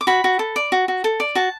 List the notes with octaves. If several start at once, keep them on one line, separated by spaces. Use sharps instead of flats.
D6
F#4 B5
F#4
A4
D5
F#4
F#4
A4
D5
F#4 A5